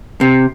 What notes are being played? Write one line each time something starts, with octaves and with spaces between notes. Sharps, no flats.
C3